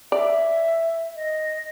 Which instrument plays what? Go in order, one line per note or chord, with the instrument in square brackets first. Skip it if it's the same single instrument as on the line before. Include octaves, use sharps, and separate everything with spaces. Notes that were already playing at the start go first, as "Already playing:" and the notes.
[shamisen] D5 [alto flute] E5
[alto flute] D#5